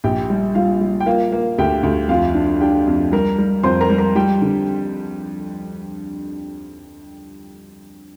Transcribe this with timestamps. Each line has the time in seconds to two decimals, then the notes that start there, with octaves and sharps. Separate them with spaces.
0.04 A#1 G4 G5
0.30 G3
0.55 G3 F4 F5
0.81 G3
1.00 G5
1.06 A#3 F4 F5
1.32 A#3
1.58 D2 G4 G5
1.83 D2
2.09 F2 F4 F5
2.35 D4
2.61 D4 G4 G5
2.87 F2
3.12 G3 A#4 A#5
3.38 G3
3.63 F2 C5 C6
3.81 A#4 A#5
3.90 G3
3.98 A#4 A#5
4.15 G3 G4 G5
4.42 D3